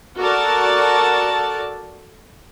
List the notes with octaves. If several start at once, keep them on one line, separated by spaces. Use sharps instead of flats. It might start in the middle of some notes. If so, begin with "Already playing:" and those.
F#4 A4 A#4 D5 A5